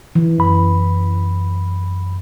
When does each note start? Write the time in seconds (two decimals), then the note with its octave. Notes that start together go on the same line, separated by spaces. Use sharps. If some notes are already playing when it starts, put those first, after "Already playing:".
0.15 E3
0.38 F#2 B5